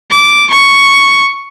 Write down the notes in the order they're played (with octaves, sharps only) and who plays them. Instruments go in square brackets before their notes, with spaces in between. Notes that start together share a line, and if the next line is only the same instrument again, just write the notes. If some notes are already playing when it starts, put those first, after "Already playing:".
[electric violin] D6
C#6